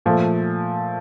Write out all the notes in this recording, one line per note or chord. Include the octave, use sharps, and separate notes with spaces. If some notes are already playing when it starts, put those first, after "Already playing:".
A#2 F3 A3